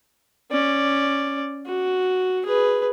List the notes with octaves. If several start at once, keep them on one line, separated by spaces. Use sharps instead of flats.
C#4 D5
F#4
G#4 B4